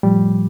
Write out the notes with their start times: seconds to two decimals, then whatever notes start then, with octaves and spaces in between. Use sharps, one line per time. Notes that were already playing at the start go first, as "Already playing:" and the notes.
0.03 A2 F3 G3